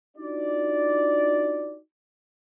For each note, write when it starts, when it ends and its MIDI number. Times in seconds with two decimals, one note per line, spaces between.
0.17 1.78 62
0.17 1.78 63
0.17 1.78 65
0.17 1.78 66
0.17 1.78 74